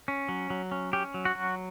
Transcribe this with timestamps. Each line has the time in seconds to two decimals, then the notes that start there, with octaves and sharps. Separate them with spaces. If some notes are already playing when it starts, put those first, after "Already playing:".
0.08 C#4
0.29 F#3
0.50 F#3
0.72 C#4
0.93 C#4 G4
1.14 F#3
1.25 F#4
1.35 F#3